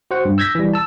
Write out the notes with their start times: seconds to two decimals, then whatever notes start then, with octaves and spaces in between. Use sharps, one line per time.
0.11 F#4 C5 F#5
0.25 G2
0.38 E6 G6 G#6 A#6 B6
0.55 E3 G3
0.74 A5 E6